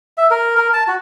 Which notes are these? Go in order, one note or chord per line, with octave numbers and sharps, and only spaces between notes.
E5
A#4
A#4
A5
F#4